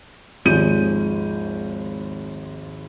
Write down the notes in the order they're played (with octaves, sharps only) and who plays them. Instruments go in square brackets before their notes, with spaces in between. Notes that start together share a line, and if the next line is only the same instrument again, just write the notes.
[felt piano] G#1 D#2 F3 G#3 G6 D#7